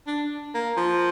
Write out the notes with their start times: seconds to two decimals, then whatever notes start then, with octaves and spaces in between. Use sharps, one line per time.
0.07 D4
0.55 A#3
0.77 F3